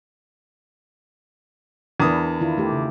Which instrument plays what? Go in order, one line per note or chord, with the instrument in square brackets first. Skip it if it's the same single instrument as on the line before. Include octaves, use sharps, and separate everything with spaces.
[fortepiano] E2 D#6 [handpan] D4 A#4 B4
[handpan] D#3 E4 F4
A3 G4
C#3